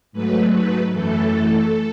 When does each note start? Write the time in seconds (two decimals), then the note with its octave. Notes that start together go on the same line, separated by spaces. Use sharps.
0.12 G#2 F#3 A3 B4
0.52 B4
0.91 F#2 E3 A3 A4